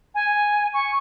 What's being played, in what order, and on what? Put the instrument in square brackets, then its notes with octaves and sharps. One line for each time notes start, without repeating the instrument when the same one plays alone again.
[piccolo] G#5
C#6